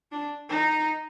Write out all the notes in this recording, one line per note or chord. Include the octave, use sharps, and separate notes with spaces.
D4
D#4